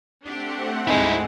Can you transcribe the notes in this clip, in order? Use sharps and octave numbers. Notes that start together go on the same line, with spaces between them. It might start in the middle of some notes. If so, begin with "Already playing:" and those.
A3 C4 D4 G4 F#5
D2 G#2 G3 G#3 D#4 E4